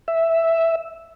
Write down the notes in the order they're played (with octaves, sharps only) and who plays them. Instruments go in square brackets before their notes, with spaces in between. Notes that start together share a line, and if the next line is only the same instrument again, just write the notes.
[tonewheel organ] E5